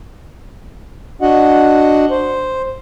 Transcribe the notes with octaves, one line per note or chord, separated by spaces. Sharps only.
D4 F#4 D#5 F#5
C5